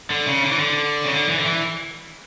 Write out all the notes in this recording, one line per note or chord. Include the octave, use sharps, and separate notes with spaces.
D3
C#3
D3
E3
D3
C#3
D3
E3
D3
E3